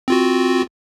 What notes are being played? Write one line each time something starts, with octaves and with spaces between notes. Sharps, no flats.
C4 F4 F#4